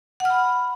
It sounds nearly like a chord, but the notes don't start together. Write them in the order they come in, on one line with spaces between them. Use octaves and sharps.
F#5 F6 B5